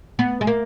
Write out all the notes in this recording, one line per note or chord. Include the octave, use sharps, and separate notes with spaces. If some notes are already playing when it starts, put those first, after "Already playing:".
B3
G#3
A#3